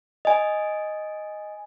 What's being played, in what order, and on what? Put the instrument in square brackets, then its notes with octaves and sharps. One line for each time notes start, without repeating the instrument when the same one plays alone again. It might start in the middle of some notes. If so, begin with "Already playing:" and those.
[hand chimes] D#5 G#5